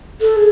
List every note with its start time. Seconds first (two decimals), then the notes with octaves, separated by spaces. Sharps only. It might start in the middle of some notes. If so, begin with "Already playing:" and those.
0.21 A4
0.36 G#4